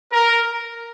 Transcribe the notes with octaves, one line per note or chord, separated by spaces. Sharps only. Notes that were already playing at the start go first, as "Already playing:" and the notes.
A#4